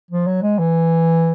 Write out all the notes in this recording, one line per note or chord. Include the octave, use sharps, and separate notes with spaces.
F3
F#3
G#3
E3